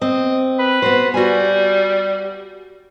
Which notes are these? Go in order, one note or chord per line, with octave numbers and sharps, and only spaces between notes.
C4 D#5
B4
B3 F#4 C5
G3 F#4 G#5